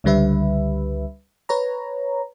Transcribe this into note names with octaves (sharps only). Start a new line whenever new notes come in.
C#2 D3 G3 B4 E5
B4 C#5 A#5